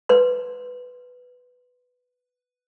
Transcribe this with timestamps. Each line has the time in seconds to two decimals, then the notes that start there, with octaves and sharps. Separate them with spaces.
0.09 B4 C6